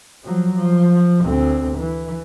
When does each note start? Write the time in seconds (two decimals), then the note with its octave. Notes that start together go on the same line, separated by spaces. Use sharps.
0.24 F3 F#3
0.56 F3
1.25 D2 C4
1.77 E3